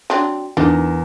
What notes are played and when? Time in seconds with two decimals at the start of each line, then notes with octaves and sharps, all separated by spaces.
0.10 F#3 C4 D4
0.57 E2 D4 D#4 A#4 E7